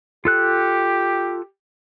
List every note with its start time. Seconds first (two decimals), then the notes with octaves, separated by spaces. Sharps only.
0.25 F4 G4 A4 F#6